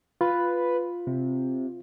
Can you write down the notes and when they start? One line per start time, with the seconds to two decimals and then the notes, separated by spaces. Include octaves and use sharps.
0.21 F4 B4
1.07 C3